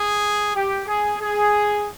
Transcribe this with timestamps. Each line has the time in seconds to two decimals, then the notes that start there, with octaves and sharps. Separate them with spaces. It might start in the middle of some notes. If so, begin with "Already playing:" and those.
Already playing: G#4
0.55 G4
0.87 G#4
1.20 G#4